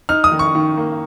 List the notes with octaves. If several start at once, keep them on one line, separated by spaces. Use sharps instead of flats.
D#4 F6
D#6
D#3
C#6
D#3
A#3